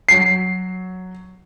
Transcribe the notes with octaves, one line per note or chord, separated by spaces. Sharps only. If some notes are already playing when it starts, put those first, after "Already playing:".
F#3 C7